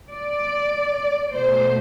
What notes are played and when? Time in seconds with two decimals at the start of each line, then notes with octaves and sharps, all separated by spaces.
0.12 D5
1.36 B2 A3 C5